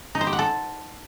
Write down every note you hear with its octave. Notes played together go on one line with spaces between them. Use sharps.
D#4
C5
G4
F#5
A4